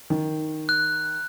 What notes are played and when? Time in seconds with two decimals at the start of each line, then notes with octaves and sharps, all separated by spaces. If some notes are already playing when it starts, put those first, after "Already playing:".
0.10 D#3
0.69 F#6